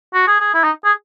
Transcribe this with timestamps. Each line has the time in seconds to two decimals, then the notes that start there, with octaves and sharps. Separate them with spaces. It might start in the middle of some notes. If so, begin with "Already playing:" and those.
0.14 F#4
0.27 G#4
0.40 G#4
0.54 E4
0.63 D#4
0.84 G#4